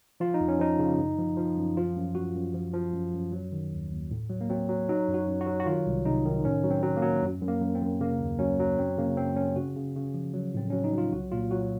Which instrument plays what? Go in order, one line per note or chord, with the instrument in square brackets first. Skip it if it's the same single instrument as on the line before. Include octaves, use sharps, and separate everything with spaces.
[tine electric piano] F3 F4
D#4
F2
C#4
F3 D#4
C#3
F#2
F3
F3
F#2
F3 F4
F#2
F#2 F#4
F#2
F3
F3
F#2
F#2
F#3
D#3
D#2
D#2
A2
F#3
A#3
F#3 C4
F#3
F#3 D#4
F#2
F#4
F#2
F#4
F#3
F#4
D#3 F4
C2
C3 D#4
D#3
A2 C#4
F#3
C4
F#3
A#3
F#3
F#2
F#2
A#3
F#2
C4
F#2
C#3 A#3
D#2
F#3 C#4
F#3
F#2 C4
C#3 A#3
F#2 C4
F#2 C#4
C#3 F#4
C#3
C#3
F3
F#3
A2 C4
F#3 C#4
D#4
F#3 F4
C2 F#4
A#2 F4
F#3 F#4